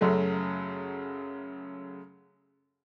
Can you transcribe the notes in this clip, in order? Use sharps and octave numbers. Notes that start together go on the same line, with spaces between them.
F#2 C#3 F#3 A3